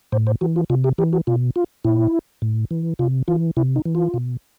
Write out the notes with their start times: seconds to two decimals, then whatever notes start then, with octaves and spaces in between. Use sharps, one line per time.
0.12 A2 C5
0.27 C5
0.41 E3 F#4
0.56 F4
0.70 C3 F4
0.84 G4
0.98 E3 G4
1.13 F#4
1.27 B2 F4
1.56 F4
1.84 A#2 E4
2.42 A2
2.71 E3
2.99 C3 F4
3.28 E3 F4
3.57 C3 E4
3.76 D#4
3.85 E3
3.95 F4
4.14 B2